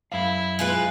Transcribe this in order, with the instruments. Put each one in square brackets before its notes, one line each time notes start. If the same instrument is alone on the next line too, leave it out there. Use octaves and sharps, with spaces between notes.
[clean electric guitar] F#2 F5 [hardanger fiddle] E4
[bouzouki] G#3 F4 B4